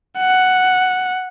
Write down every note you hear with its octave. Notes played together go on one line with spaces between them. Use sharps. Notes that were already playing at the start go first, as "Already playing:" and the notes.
F#5